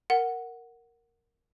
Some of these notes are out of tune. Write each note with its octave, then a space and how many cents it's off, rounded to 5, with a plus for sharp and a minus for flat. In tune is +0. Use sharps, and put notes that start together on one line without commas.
A#4 -5 F#5 +0